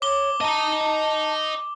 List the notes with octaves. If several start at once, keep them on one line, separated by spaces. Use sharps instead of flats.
C#5 D6 G7
D#5 A5 A#5